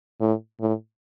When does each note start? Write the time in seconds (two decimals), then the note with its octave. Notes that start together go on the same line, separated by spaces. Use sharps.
0.21 A2
0.61 A2